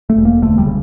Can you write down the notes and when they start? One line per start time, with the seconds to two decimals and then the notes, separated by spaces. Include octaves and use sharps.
0.10 A3
0.16 E1
0.25 A#3
0.42 D2 A3
0.58 G3
0.66 C#3